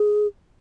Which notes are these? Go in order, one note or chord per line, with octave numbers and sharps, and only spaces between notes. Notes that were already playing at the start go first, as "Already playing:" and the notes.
Already playing: G#4